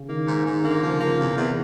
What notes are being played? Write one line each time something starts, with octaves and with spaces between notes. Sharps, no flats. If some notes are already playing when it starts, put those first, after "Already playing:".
Already playing: C#3
D#3 A#3
G#2
G#2 D#3
D3 A#3
C#3 F3
C#3 A#3
E2 C3
E2